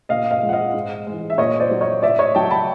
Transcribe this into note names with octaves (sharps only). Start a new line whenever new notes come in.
A#2 D#5 F5
D#5 F5
F3 G#3
F#5
D#5 F5
G#2
E3 G#3
E5
A#2 C#5 D#5
C5 D5
F#3
C#5 D#5
A2 D5 E5
C#5 D#5
F#3 G5 A5
A5 B5